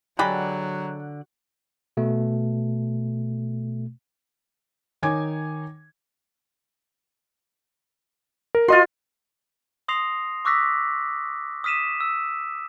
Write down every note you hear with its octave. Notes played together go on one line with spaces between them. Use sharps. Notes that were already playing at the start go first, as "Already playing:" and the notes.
D3 F#3 G#3 G4 D5 F#5 B5
B2 A3
D#3 D#4 C#5 G#5 D6 G#6
A#4
F4 F#4 D#5 C6
C6 D#6 A#6 C7 F7
C#6 D6 E6 F#6 A#6 B6
D#6 F6 B6 D#7 E7
E6